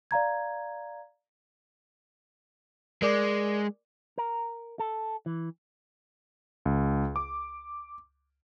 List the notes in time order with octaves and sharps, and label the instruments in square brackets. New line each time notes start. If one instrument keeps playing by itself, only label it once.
[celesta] D5 F5 A#5 G#6
[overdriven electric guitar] G#3 [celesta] A#4 D5 D6
[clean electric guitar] A#4
A4
E3
[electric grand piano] C#2
D6